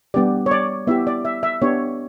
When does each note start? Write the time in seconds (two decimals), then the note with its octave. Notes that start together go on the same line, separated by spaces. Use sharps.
0.14 G3 B3 D4 G4 D5
0.46 C#5
0.51 D5
0.87 B3 E4 G4 E5
1.07 D5
1.25 E5
1.43 E5
1.62 B3 D4 G4 C#5